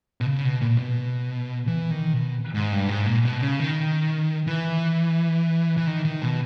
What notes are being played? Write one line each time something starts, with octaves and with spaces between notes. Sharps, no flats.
B2
C#3
B2
A#2
B2
E3
D#3
B2
G#2
G2
G#2
A#2
B2
C#3
D#3
E3
E3
D#3
D#3
B2